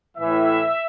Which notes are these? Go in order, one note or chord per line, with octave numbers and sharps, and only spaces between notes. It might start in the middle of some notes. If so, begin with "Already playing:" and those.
A2 E3 E5